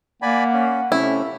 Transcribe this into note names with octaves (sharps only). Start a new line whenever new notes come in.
A#3 D5 F#5 G#5 B5
C#4
C3 A3 C#4 E4